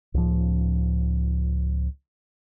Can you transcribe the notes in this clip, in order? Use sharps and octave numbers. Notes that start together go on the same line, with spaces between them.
C#2 A2 F3